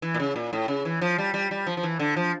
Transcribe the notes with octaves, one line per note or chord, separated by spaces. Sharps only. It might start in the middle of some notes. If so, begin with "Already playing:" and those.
E3
A#2
C#3
A#2
A2
C#3
E3
F3
G3
G3
G3
F3
F3
E3
D3
F3